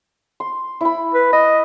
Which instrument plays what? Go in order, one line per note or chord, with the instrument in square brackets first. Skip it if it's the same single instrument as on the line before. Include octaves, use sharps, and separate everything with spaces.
[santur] C6
E4 B5
[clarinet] B4
[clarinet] D#5 [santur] B5